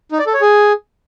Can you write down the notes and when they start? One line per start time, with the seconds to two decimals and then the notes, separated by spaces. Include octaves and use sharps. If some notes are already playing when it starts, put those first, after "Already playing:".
0.12 D#4
0.19 D5
0.26 A4
0.34 C#5
0.41 G#4